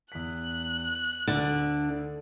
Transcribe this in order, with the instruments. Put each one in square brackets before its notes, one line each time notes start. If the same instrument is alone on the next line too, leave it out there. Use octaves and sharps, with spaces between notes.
[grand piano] E2 B6 [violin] F#6
[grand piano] D2 A6 [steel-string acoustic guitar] D3